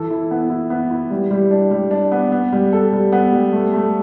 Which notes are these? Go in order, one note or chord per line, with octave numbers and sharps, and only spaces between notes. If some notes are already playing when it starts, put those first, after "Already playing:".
Already playing: E3 A4
E4
B3
E4
B3
E4
G3
G3
D4
G3
D4
B3
B3
G3
A4
G3
B3
G3
A3
A3